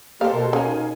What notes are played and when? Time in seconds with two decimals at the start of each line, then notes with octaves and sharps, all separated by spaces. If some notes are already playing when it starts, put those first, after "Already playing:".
0.21 A#3 G4 A4 C5 F5
0.33 B2 A#4
0.53 A#3 C#4 A#4 F5 G#5
0.66 D#4